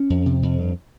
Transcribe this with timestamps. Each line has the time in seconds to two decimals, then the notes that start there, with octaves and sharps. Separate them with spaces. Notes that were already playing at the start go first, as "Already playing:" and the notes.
Already playing: C#4
0.10 F2
0.26 C3
0.43 F2
0.59 G2